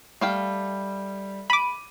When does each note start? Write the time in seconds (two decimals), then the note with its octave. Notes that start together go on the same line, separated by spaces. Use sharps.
0.21 G3 A3 F5 G5
1.50 B5 D6 D#7